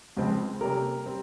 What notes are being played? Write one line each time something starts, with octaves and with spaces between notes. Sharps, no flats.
C#2 C#3 F3 G#3 C4
C3 G3 A#3 C#4 A#4
G3 C4